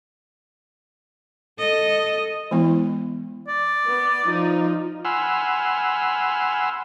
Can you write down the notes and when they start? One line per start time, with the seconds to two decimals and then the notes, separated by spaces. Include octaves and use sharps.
1.58 A4 D#5
2.51 E3 G#3 B3 E4
3.48 D5
3.85 B3
4.25 F3 D#4
5.05 F#5 G#5 B5 C6 E6 F6